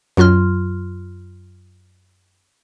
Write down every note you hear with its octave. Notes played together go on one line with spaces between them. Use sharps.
F#2 F#3 F4 C6 F6